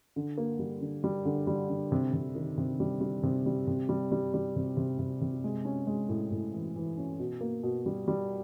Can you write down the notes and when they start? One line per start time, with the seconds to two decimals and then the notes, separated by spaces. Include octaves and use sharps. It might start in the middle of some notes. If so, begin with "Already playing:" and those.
0.16 D3
0.38 A#3
0.59 G3
0.81 D3
1.04 G3
1.25 D3
1.47 G3
1.69 D3
1.92 C3
2.13 C3
2.35 D#3
2.58 C3
2.80 G3
3.01 G3
3.23 C3
3.46 G3
3.67 C3
3.89 G3
4.12 G3
4.34 G3
4.56 C3
4.77 C3
4.99 C3
5.21 C3
5.44 G#3
5.65 C#4
5.87 G#3
6.09 A2
6.31 A2
6.54 E3
6.76 E3
6.98 C#4
7.19 B2
7.41 A#3
7.63 B2
7.86 G3
8.08 G3